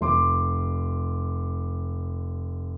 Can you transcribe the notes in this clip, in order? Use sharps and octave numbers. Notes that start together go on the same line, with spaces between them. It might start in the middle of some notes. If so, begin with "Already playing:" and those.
F1 C6 D6